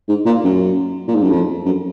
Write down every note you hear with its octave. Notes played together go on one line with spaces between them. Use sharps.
G#2
A#2
F#2
A#2
G#2
F#2
F2
F#2